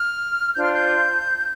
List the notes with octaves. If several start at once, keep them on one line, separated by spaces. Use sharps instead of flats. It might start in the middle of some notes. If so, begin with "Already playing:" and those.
Already playing: F6
D4 F4 C5 G6
F6
G6